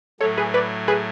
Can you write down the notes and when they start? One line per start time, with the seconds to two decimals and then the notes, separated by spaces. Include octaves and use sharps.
0.20 A2 F#3 A3 A4 C#5
0.37 G#4 B4
0.54 B4 D5
0.88 G#4 B4